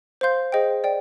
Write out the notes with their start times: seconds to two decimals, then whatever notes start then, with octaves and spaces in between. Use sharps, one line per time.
0.21 C5 F5 C6 G6
0.52 G#4 C5 D#5 G5
0.84 D5 G5